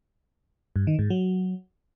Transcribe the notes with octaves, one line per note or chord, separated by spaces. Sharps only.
G2
D#3
G#2
F#3